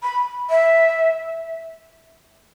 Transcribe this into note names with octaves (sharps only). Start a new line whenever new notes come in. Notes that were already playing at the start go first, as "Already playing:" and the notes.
B5
E5